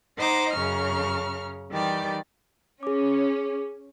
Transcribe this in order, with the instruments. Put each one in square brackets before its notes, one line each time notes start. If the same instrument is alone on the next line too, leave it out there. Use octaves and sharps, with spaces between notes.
[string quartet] D#4 C5 D#5 F#5 A#5 D6
F#2 C#3 A#5 C#6 F6
D#3 E3 G3 G4 D5
[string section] C#4 [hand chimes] G#4 D6